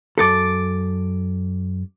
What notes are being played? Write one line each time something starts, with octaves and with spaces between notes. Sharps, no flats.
F#2 A4 D6 A6 C#7